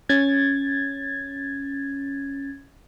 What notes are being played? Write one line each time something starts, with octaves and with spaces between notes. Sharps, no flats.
C#4 G#6 A6